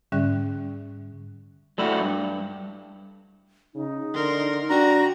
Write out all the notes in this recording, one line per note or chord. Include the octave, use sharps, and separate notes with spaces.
G#2 D3 G3 C#4 E5 F#6
G3 A3 E4 F#4
G2
C#3 D#4
D3 A#4 C6
D4 F#4 G5 A#5